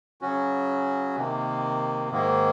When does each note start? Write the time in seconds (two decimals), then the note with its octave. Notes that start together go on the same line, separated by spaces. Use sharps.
0.21 C#3 F#3 C#4 F#4
1.16 C3 D#3 A#3
2.11 G#2 D#3 A#3